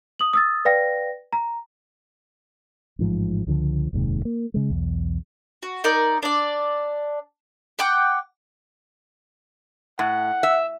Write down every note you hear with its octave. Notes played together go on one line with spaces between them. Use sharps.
D#6 F#7
D#6 E6 A6
B4 D5 F5 G5 A#6
A#5
A1 G#2 F3
C#2 D3 F3
F1 D#2 G#2 C3
A#3
C#3 G#3
B1 E2
F#4
D#4 A#4 D5
D4 D5
F#5 G5 D6 F#6
A2 F#5
E5